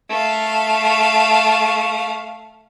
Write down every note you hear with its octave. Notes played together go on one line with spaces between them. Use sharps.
A3 F5